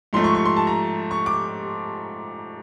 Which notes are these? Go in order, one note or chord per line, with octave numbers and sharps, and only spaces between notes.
G#2 F3 A3 C6
C#6
C#6
C6
A5
A#5
C#6
D6